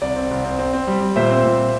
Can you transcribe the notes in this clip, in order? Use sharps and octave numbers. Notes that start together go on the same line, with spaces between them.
C2 D5
C4
C2
C4
C4
C4
G3
G3
A#2 C5 E5
C4
A#2